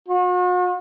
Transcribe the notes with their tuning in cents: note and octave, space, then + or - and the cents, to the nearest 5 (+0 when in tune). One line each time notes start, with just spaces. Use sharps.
F#4 -45